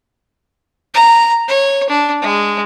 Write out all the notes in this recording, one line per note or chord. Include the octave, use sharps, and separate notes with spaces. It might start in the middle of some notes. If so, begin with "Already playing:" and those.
A#5
C#5
D4
G#3